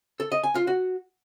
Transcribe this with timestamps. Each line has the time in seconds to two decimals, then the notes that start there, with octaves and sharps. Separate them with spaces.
0.20 A4
0.32 D#5
0.43 G#5
0.55 F4
0.67 F#4